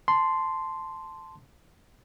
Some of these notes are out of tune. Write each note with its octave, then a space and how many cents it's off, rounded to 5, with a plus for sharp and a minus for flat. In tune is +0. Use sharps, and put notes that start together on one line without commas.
A5 +0 C6 -5